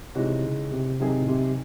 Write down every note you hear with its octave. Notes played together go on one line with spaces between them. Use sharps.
C3 E3 G#3 D#4 F#4 C#5
C#3
C3
C3 D#3 F#3 C4 D#4 G#4
A2
C3